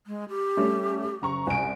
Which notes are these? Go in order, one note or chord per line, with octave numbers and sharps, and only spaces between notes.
G#3
G4
G3 A3 C#4
F#1 A#5 C#6
C2 G#5 D7